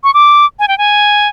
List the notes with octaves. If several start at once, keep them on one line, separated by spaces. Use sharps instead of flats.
C#6
D6
G#5
G5
G#5